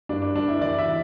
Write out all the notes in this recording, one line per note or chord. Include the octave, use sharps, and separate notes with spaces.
G2 D4
D4
G3 D4
E4
E3 D5
E5
E3